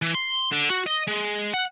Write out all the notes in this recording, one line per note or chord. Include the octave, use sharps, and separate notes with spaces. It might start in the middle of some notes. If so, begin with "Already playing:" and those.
E3
C6
D3
F#4
D#5
G#3
F#5